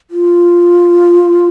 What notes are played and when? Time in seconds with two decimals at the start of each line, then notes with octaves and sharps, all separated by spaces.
0.11 F4